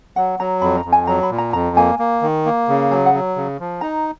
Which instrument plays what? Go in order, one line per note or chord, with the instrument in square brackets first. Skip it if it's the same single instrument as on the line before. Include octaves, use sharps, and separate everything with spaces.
[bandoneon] F#3 [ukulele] F#5
[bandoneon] F#3 [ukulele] A#5
[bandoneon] F2 [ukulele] B5
[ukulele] A#5
[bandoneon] F2
[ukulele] G#5
[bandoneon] F#3 [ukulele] A#5
[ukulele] B5
[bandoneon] A#2
[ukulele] A#5
[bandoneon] F2 [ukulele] A#5
[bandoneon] A#3 [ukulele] G#5
[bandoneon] A#3
D#3
A#3
C#3
[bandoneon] F#3 [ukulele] G#5
[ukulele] F#5
[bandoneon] F#3
C#3
F3
[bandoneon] D#4 [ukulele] A#5